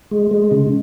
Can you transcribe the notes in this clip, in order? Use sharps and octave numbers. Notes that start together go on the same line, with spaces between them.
G#3
G#3
C#3